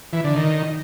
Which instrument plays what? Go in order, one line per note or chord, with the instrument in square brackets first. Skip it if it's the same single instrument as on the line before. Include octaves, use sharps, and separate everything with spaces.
[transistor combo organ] E3
D3
D#3